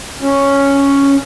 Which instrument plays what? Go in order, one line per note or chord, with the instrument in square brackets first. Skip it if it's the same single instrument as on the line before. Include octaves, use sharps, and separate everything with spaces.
[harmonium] C#4